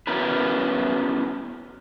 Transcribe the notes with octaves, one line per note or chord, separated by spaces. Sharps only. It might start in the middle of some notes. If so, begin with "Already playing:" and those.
B3 C#4 E4 F#4 A#4 B4